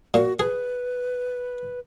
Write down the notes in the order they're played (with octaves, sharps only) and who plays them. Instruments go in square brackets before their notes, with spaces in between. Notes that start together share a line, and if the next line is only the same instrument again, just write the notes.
[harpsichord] A#2 [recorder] F#4
[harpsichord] G#4 [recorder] B4